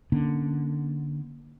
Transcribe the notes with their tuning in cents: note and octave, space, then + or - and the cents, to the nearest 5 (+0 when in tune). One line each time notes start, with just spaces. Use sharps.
D3 +5 A#3 +15 C#4 +0